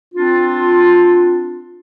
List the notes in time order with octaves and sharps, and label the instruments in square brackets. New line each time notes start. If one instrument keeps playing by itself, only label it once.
[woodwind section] C4 D4 F4